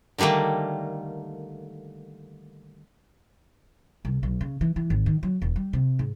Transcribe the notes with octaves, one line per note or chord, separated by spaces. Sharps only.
D3 D#3 G3 A3 A#3
C2
B1
C#3
E3
E3
G#1
D#3
F#3
E1
G3
C3
G#2